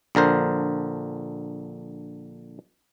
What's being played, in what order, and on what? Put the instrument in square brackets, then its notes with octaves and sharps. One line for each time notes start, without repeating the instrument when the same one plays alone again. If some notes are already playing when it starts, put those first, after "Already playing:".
[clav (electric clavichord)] A#1 D3 A#4 C5